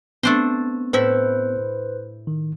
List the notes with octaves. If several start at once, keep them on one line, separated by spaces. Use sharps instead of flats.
A3 B3 C4 D4 C5
A2 E4 B4 C5 E5
D#3